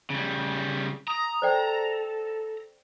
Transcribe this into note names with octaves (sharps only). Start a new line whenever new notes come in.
C#3 G3
A#5 D#6
A4 C5 D5 G5